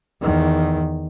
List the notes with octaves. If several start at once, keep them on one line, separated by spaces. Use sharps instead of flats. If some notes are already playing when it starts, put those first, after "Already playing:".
E2 D#3